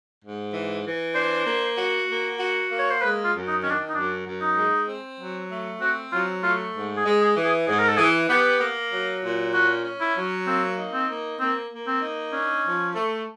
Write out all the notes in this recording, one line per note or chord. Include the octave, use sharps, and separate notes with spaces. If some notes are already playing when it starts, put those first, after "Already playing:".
G#2
E3
E3
D4 C5
A#3
F#4
A#3
F#4
A#3
C#5
C5
G#3 B4
F4
F#2
D#4
D#3 C#4
D4
D#4
F#2 D4
F#2
D#4
G#3
C4
F#3
A3
C4 F#4
F#3 F4
A3 F4
G#2
G#4
G#3
G#4
E3
G#4
G#2 G#4
A#4
A4
E3 G#4
B3 G4
A#3
F#3
A#2
C#4 F#4
C#4
E4
F#3
A#3 C4
D#4
C4
A#3
A#3 C4
A#3
C4
D#4
C#4 D4
F3
A3